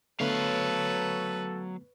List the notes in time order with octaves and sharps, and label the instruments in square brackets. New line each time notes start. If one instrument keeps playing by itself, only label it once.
[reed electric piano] D3 A3 B3 [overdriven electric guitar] F#3 F5 [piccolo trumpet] A4 [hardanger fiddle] B4 C#5